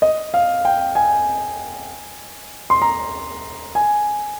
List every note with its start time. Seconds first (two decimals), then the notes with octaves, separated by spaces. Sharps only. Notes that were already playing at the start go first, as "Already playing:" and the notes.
0.02 D#5
0.34 F5
0.65 G5
0.95 G#5
2.70 C6
2.82 A#5
3.75 G#5